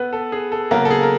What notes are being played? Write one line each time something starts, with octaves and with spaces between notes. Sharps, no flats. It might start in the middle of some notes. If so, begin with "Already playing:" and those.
Already playing: B3 A4 B4
A4
G#4
A4
C#3 F#3 A#3 B3 A#4
A4
G#4
A#4